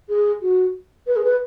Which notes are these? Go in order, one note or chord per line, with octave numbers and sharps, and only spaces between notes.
G#4
F#4
B4
G#4
B4